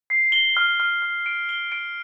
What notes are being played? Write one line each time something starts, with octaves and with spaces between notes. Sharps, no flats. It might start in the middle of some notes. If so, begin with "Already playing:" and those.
C7
G7
F6
F6
F6
D7
G7
D7